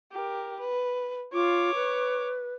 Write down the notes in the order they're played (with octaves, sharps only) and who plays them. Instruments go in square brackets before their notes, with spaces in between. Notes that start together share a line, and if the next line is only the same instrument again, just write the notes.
[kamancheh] G4 A#4
B4
[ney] F4 [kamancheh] C#5 D6
[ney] B4